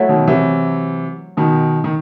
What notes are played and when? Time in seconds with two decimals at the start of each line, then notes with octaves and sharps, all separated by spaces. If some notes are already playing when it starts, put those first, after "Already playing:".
Already playing: F#3 A3 E4
0.09 B2 D#3
0.28 C3 E3
1.37 B2 D#3
1.84 D#3